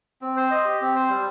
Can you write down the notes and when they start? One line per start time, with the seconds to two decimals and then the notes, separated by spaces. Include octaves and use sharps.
0.22 C4
0.36 C5
0.51 D#5
0.65 G4
0.81 C4
0.95 C5
1.10 G3